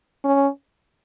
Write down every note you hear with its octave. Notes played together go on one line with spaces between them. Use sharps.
C#4